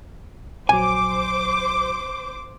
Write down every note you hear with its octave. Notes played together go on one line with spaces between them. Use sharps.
A#1 F#3 C5 G#5 D6